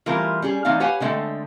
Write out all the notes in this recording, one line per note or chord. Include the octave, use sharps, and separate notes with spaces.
E3 G3 A3 C4 F4 A#4
G3 C#4 G#4
E3 A3 C4 D#4 D5 F5
G4 B4 C#5 F5 F#5 G#5
D3 G#3 A3 C4 A4